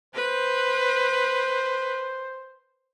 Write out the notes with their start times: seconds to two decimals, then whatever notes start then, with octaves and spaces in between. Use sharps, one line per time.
0.15 B4 C5